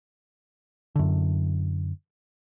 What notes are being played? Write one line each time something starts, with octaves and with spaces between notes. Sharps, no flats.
F#2 D3